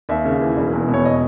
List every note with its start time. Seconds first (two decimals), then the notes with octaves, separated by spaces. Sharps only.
0.09 D#2 E5
0.25 C#3
0.41 E3
0.57 E1
0.73 E2
0.88 B2
0.94 C#5
1.05 D#5